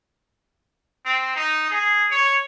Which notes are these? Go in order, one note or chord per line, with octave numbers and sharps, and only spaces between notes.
C4
D#4
G#4
C#5